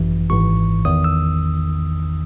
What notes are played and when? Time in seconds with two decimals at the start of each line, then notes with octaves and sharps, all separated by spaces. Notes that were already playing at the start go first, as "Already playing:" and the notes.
Already playing: G#1 F#2 E3
0.29 G#1 G#2 E3 C#6
0.85 E2 D#3 D#6
1.04 E6